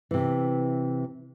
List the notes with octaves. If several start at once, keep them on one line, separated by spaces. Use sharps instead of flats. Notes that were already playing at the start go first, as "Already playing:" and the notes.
C3 E3